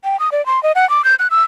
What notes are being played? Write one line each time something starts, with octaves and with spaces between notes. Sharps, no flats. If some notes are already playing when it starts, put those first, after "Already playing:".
G5
D#6
D5
C6
D#5
F#5
D6
G6
F#6
E6